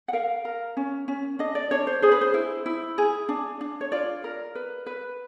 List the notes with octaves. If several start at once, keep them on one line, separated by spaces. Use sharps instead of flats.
F#5
A#4 F5
A#4
C#4
C#4
D4 D#5
D5
D4 C#5
C5
G#4 C5
B4
C5
E4
E4
G#4
D4
D4
C#5
F4 D5
A#4
B4
B4